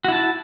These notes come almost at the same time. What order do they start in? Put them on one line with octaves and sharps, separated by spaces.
F#4 E4 A5